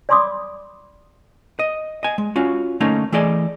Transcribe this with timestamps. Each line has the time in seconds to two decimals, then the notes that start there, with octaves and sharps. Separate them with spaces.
0.09 D5 G#5 B5 C6 D6 D#6
1.59 D#5
2.03 D#5 G#5
2.18 G#3
2.36 C#4 F4 F#4
2.80 D3 A3 A#3 C#4 D#4
3.12 E3 A3 G#4 D5 D#5